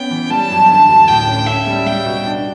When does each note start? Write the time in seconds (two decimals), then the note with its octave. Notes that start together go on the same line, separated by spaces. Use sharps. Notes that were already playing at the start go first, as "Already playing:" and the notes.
Already playing: B3 C#4 G5
0.11 E3
0.30 G3 A5
0.50 F#2
0.69 D3
0.89 D2
1.08 A2 G5
1.27 C#4
1.47 C#4 E5
1.67 G3
1.86 G3 G5
2.05 B2
2.26 D4